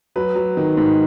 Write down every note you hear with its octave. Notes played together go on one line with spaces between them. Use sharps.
F#3 B4
F#3
D#3
G#2